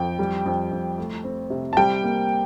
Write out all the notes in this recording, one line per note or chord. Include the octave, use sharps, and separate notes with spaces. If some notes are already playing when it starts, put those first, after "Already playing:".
Already playing: F2 G5
G3
F2
F2
A3
C4
C3
A5
G3 G5
A#3